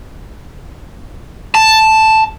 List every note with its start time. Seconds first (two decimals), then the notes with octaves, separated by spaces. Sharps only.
1.55 A5